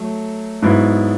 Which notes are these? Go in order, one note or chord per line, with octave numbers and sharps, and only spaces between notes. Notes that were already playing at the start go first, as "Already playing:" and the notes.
Already playing: F#3 A3
G#2 F#3 B3 E4